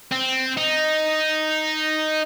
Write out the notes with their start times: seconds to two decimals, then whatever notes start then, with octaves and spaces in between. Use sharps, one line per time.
0.12 C4
0.57 D#4